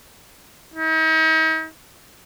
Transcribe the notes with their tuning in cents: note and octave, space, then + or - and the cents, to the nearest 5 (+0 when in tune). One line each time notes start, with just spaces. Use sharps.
D#4 +40